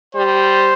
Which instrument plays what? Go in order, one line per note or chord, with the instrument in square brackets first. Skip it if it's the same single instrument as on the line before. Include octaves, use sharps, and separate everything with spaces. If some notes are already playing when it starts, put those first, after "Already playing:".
[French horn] G3 [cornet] C5